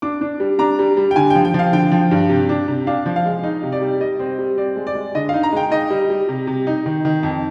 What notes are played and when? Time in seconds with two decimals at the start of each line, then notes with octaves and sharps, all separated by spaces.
0.02 D4 D6
0.21 D4
0.40 G3
0.59 D4 A#5
0.79 G3
0.97 G3
1.11 G5
1.16 D3 G#5
1.30 G5
1.35 F3
1.45 G5
1.54 F3 F5
1.73 D3 G5
1.92 F3
2.11 G2
2.29 C3
2.49 D4
2.68 C3
2.87 D4 F5
3.06 F3
3.16 F5
3.25 G#3
3.44 D#4
3.63 C3
3.72 D5
3.82 G3
4.00 G3 D#5
4.19 C4
4.39 G3
4.58 C4 D5
4.76 G#3
4.87 D5
4.95 G#3
5.15 D3 D#5
5.29 D#4 F5
5.43 A#5
5.53 G#3 G5
5.71 D#4 D#5
5.90 G3
6.10 G3
6.29 C3
6.47 C3
6.67 D#4
6.86 D#3
7.05 D#3
7.23 F2